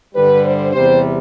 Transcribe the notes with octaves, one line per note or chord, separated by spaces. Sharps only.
G2 D3 G3 B4
C5
E2 C3 G3 C5